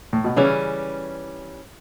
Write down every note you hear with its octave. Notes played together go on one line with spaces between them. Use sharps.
A2
B2
C#3 E3 G3 C#4